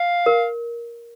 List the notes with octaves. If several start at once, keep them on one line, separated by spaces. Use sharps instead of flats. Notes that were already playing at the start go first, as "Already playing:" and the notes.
Already playing: F5
A#4